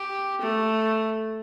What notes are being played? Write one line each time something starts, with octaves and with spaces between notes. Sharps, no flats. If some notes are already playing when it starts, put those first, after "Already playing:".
Already playing: G4
A3